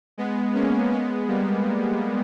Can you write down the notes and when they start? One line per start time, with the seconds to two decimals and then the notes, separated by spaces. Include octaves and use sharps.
0.18 G#3 B3
0.54 A#3 C#4
0.91 G#3 B3
1.28 G3 A#3